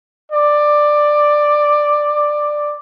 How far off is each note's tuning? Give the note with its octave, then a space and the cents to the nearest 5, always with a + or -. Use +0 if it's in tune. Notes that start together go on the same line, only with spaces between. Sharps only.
D5 +10